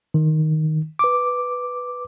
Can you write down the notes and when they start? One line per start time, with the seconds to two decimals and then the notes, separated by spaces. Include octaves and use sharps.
0.14 D#3
0.99 B4 D6